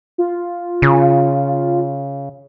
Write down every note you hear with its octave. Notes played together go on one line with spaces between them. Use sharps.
F4
C#3